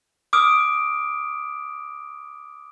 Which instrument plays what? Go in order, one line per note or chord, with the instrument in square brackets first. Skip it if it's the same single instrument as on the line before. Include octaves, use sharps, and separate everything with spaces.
[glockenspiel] D6 D#6 F6 D7